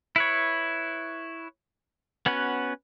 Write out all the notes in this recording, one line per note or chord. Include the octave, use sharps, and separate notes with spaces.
E4 B4 C#5
B3 C#4 F#4 B4